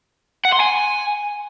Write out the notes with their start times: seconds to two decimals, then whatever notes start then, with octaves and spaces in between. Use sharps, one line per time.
0.45 F#5
0.53 C6
0.60 G#5